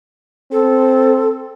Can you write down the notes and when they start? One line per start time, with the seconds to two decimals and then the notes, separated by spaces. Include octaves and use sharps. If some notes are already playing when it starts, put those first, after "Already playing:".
0.52 C4 A4